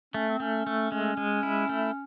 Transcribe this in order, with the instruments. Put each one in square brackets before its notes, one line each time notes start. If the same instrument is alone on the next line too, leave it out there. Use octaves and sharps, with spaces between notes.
[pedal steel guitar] A3 [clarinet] C#4
[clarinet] C4
[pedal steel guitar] A3 [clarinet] C#4
[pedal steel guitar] A3
[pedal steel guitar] G#3 [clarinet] C#4
[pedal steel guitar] G#3
E4
A3